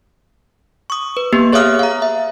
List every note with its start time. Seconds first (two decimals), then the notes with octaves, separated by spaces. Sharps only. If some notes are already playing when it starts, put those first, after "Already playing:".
0.90 C#6 D#6
1.17 B4
1.33 A#3 B3 G4
1.53 G#4 C#5 E5 F5 D#6 F6
1.79 F5 A#5
2.02 E5